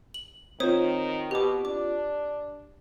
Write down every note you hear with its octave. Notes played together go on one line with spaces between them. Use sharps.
F#7
D#3 C4 F4 C5 C#5 D#6
B2 G4 D6
D4 D6